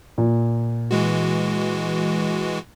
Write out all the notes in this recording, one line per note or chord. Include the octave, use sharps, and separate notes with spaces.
A#2
E3 G#3 F#4